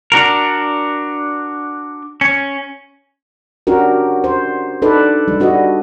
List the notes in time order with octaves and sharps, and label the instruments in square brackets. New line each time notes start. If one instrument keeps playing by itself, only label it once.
[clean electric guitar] D4 F#4 A#4
C#4
[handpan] C#4 D4 F#4 G4 A#4
C5
D4 D#4 A4 B4 D5
G3
D4 F#4 B4 D#5